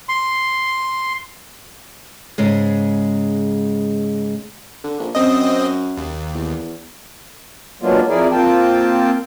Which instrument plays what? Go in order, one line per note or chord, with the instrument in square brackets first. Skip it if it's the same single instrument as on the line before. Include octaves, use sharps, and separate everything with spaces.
[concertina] C6
[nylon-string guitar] G#2 C#3 G#3
[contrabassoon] D3
A#1
[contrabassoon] F#2 [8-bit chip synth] C4 D#5
[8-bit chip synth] D#2
[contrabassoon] E2
[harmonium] F#3 G#3 A#3 B3 D4 F4
F2 F3 E4 G#4 A#4 D5
A#3 C4 F4 G5 A5